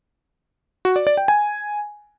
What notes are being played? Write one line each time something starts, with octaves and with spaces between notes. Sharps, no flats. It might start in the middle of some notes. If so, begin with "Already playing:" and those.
F#4
D5
D5
G5
G#5